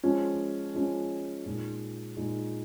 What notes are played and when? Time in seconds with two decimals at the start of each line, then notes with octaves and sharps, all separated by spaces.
0.03 F3 G#3 C#4
0.74 F3 G#3 C#4
1.45 A#2 G#3 D#4
2.17 A#2 G#3 D#4